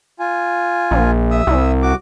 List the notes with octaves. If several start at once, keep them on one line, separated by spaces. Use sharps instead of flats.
F4 G#5
A#1
E5 D#6 E6
C2
F#4 D6